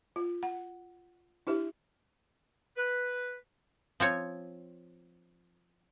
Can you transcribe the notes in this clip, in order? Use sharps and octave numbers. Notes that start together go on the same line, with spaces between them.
F4
F#5
D4 E4 G4 E5
B4
F3 C4 C#5